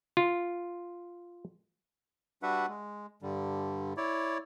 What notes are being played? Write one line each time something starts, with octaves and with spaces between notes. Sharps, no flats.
F4
G3 D4 F#4 B4 E5 F#5
G#3
G2 D3 G3
E4 C#5 D5